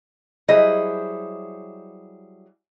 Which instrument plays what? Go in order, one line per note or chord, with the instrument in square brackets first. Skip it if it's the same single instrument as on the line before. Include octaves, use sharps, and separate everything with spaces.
[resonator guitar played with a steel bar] F#3 G3 E4 G#4 C5 D#5